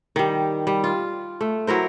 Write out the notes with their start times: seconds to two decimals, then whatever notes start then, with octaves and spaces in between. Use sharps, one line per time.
0.16 D#3 G3
0.67 G3
0.84 F4
1.41 A3
1.67 F#3 E4 A#4 C5